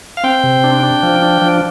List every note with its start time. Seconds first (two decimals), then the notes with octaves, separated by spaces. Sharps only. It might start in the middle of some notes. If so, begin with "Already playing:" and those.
0.17 F5
0.24 C4 G5
0.43 C3
0.64 D4
0.83 D4
1.03 F3
1.22 D4
1.42 F3